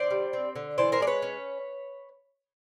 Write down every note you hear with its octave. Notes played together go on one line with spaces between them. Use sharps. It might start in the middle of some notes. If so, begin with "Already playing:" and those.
Already playing: D3 C5 D5
G3
C4
D3
E3 C5 D5
A#4 C5
G#3 D5
B4 C#5
C#4